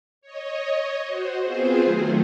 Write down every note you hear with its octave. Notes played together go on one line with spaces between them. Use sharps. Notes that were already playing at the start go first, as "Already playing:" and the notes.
C#5 D#5
F#4 C5
B3 C4 F4 G#4 C5
D#3 F#3 A3